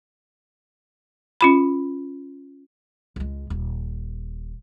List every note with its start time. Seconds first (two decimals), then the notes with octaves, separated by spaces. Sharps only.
1.41 C#4 F4 B5
3.16 C#2 G#3
3.50 D#1